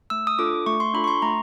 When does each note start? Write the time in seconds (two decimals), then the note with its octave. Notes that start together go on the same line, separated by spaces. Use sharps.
0.10 A3 E6
0.27 D#6
0.39 D4 F4 A4 D6
0.66 A3 C#6
0.80 C6
0.94 D4 F4 A4 B5
1.04 C#6
1.08 C6
1.22 A3 A#5